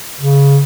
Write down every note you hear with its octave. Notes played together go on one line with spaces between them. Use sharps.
C#3